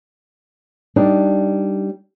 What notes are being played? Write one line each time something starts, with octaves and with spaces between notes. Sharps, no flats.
G3 D4 D#4